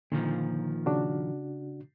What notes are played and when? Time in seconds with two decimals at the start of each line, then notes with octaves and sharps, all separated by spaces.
0.12 A#2 D3 D#3 F3
0.86 C#3 D4 F#4